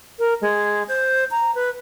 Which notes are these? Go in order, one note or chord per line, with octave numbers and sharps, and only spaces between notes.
A#4
G#3
C5
A#5
B4